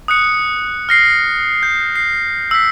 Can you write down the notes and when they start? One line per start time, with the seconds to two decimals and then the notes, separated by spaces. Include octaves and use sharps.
0.08 D#6 F#6 C#7
0.89 F6 A#6 C7
1.63 G6
1.96 C7
2.51 E6 B6